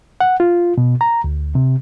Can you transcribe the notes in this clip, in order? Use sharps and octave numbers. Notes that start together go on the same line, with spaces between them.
F#5
F4
B2
A#5
D2
C3